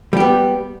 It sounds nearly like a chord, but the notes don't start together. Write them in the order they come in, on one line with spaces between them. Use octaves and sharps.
G3 G4 B3